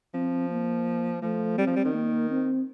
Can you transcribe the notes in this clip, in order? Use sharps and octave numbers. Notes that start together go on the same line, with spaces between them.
F3 C4
A#3
F3 A3
G3 C4
F3
G3
D#3
A#3
C4